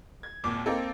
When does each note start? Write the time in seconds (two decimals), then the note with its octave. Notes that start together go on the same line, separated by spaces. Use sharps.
0.23 G#6
0.44 G#1 D#2 A#2 D6
0.66 A#3 C4 D#4 A4